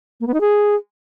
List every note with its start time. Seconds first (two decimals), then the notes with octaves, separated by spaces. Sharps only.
0.20 A#3
0.27 B3
0.34 D#4
0.41 G#4